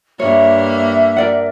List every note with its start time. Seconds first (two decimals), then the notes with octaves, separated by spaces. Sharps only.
0.20 G2 A#3 C#5 E5
1.17 A#4 D5 F#5